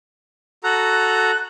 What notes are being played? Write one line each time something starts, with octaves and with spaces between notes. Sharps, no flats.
F#4 A4 A#5 F#6